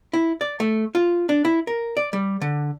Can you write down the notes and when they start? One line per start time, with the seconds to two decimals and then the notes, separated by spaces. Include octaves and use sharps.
0.13 E4
0.41 D5
0.60 A3
0.95 F4
1.29 D4
1.45 E4
1.67 A#4
1.97 D5
2.13 G3
2.41 D3